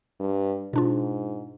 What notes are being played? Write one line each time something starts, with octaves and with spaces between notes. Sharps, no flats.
G2
G#2 B2 D4 F4